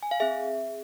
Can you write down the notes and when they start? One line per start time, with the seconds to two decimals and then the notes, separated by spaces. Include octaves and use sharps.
0.03 G#5
0.11 F5
0.20 C4 G#4 E5